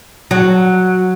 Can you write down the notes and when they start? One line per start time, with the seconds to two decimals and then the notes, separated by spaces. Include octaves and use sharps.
0.31 F#3